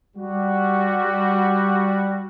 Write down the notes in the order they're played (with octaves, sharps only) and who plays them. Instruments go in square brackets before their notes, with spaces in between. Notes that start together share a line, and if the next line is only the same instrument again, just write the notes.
[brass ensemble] G3 F#4